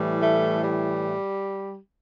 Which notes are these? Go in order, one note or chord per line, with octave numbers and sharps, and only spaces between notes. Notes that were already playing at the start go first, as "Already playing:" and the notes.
Already playing: A2 E3 G3
A3
G3